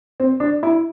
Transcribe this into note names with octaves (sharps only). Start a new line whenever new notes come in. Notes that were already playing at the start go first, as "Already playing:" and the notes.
C4
D4
E4